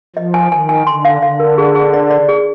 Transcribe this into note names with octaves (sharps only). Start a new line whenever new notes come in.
F3 D#5
G#5
D#3 G#5
G#5
D3 C6
F5
D3 F5
A#4
G#4
G#4
D5
D5
G#4